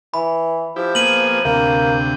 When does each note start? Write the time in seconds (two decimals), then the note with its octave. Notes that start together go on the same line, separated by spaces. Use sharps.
0.14 E3 B5
0.76 F3 E4 G4
0.95 A#3 B3 G#4 D#7 F#7
1.45 D2 C3 A#3 G5